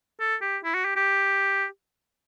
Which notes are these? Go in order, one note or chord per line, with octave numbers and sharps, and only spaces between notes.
A4
G4
E4
F#4
G4
G4